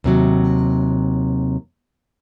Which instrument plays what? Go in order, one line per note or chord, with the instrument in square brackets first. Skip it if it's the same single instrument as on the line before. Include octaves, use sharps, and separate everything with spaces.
[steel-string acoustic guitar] D#2 C3 F#3